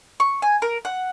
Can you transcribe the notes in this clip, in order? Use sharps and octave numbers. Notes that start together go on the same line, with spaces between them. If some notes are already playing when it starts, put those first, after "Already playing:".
C#6
G#5
A#4
F#5